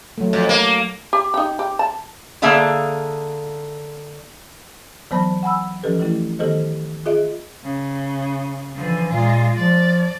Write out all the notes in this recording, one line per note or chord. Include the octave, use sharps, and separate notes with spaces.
F#3 A3
F2
A#3
G4
D#4 G4
G4
A5
D3 A#3 G#4 E5 F5 A5
E3 F#3 B3 C5 A5 B5
F#5 G#5 B5 E6
E3 F3 C#4 G4 A4 B4
E3 F3 A3 E4
D#3 B3 G4 A4 C5 D#5
F4 G#4 D#5 E5
C#3
D3 E3 F3
A#2 G#3 F4
F3 D5